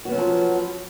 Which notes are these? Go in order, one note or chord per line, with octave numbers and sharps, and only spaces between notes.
F3 F#3 B3 C#4 F#4